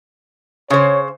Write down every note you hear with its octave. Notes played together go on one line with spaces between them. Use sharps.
C#3 C5 C#5